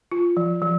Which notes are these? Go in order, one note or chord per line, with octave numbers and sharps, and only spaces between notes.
F4
F3
F3